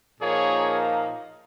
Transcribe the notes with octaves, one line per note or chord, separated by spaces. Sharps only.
A#2 F3 A#3 D#4 G#4 C#5